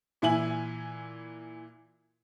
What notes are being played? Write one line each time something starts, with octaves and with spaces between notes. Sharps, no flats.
A#2 E3 E4 G#5 F#7